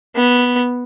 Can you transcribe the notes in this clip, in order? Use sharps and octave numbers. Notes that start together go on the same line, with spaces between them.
B3